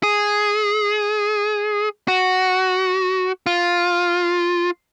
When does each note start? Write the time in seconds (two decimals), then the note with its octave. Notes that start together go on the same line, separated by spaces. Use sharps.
0.03 G#4
2.08 F#4
3.46 F4